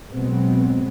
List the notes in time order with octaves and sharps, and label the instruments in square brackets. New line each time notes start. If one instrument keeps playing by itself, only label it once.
[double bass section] B2 F#3 G#3 B3 C4